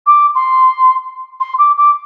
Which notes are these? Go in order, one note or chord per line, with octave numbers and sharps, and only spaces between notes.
D6
C6
C6
D6
D6